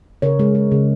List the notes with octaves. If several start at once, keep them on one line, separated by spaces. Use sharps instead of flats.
C#3 A#4 C#5
G#3
G#3
C#3